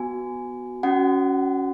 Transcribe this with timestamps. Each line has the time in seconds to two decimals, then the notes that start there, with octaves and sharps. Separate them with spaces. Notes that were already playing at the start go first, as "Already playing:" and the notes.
Already playing: B3 F#4 G#5
0.83 C#4 F#4 F#5